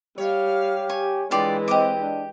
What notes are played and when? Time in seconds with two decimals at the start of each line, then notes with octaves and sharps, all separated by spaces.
0.18 G3 G4 C#5 F5
0.89 G#5 C#6
1.31 E3 G#3 D4 F4 G4 D5
1.68 C4 G4 D#5 D6
2.01 D4